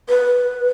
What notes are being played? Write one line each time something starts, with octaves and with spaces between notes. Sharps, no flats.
B4